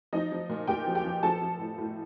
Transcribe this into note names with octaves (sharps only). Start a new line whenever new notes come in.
F3 D#4 D#5
F3
A#2
A#2 G4 G5
F3
G4 G5
F3
F3 A4 A5
F3
A2
A2